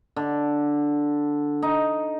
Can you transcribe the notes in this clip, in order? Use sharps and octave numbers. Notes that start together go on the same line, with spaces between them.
D3
D#4